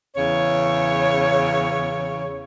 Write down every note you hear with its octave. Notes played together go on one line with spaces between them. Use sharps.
E2 C#3 C#5